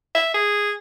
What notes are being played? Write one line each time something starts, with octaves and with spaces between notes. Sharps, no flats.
E5
G#4